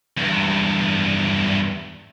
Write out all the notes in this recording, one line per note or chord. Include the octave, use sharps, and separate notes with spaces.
E2 G2